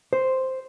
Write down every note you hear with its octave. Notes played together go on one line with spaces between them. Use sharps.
C5